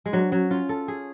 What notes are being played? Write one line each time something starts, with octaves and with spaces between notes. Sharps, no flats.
G#3
F#3 D4
F#3 C#4
C#4 F4
A4
G#4